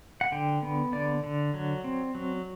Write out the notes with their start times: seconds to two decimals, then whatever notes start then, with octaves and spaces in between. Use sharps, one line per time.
0.21 F#5
0.32 D3 G5
0.62 B3
0.92 D3 D5
1.24 D3
1.54 F#3
1.84 C4
2.15 F#3